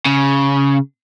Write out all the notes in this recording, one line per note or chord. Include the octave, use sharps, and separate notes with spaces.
C#3